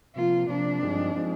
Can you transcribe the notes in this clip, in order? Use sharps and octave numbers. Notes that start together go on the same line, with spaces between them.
C3 F3 A#3 F4
C3 F3 A#3 D4
G2 F3 G#3 C4 D#4
F3 G#3 C4 D#4